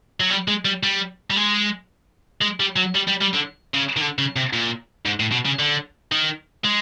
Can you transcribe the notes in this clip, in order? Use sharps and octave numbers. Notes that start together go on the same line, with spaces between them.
F#3
G3
G#3
G3
G3
G3
G#3
G#3
G3
F#3
G3
G3
G3
D3
C#3
D#3
D3
C#3
C3
A#2
G#2
A2
B2
C#3
D3
D#3
G#3